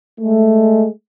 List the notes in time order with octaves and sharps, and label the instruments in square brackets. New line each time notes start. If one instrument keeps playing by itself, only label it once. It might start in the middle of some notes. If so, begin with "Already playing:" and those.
[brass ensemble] G#3 A3